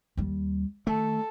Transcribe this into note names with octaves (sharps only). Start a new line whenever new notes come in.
D#2 G3
D#3 A3 A4